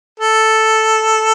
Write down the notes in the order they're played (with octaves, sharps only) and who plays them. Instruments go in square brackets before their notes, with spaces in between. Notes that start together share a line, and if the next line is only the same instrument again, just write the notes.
[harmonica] A4